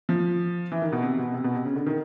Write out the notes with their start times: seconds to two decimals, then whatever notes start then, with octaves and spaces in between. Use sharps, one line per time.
0.09 F3
0.72 E3
0.82 D#3
0.92 B2
1.03 C3
1.19 B2
1.34 C3
1.44 B2
1.55 C3
1.65 C#3
1.76 D3
1.86 D#3